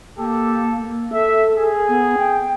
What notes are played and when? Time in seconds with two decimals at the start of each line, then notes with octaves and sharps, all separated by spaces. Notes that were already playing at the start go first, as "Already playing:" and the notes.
0.18 A#3 G4 A4
0.83 A#3
1.13 A4 E5
1.56 G#4
1.88 B3
2.18 G5